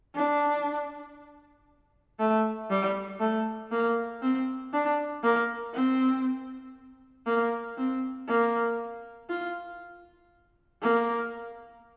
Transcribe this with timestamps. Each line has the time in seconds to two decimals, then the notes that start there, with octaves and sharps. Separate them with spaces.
0.15 D4
2.19 A3
2.70 G3
3.20 A3
3.71 A#3
4.22 C4
4.73 D4
5.23 A#3
5.74 C4
7.26 A#3
7.78 C4
8.28 A#3
9.29 F4
10.82 A#3